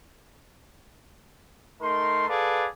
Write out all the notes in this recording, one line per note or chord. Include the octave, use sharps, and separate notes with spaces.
A3 D#4 A#4 C6
G#4 A4 B4 D5 F5